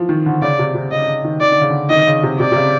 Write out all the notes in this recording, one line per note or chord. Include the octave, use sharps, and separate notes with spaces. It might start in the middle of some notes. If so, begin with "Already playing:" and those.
Already playing: E3 F3
D#3
D3
C#3 D5
C3
C3
C#3 D#5
C#3
D#3
D#3 D5
D3
C#3
D3
D#3 D#5
C#3
C3
C3 D5
C3
C#3